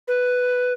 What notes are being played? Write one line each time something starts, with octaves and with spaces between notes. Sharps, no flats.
B4